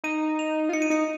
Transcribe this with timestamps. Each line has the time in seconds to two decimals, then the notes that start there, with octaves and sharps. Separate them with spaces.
0.04 D#4 D#7
0.39 F7
0.69 F4
0.73 D#4 C#7
0.82 D#7
0.90 D#4 C#7